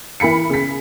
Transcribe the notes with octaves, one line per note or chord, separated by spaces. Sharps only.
E3 A#4 B5 B6 C#7
C#3 B6